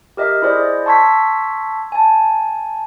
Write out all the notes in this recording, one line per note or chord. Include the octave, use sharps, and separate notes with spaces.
G4 A#4 D#5 E5
E4 G#4 C5 D5 D#5
A5 C6 C#6 E6 G#6 B6
G#5 A5